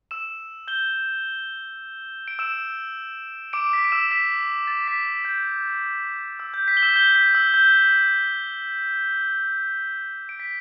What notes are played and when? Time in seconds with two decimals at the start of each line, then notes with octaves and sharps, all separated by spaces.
0.11 E6 E7
0.68 G6 G7
2.28 D7
2.39 E6 E7
3.53 D6 D7
3.73 B6
3.85 D7
3.92 E6 E7
4.11 B6
4.67 A6
4.88 B6
5.06 B6
5.25 G6
6.39 E6
6.54 G6
6.68 B6
6.77 G7
6.82 E6 E7
6.96 G6 G7
7.15 B6
7.35 E6
7.54 G6
10.29 D7
10.40 B6